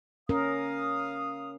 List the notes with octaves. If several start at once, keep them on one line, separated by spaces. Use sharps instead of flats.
C#4 A#4 F5 D#6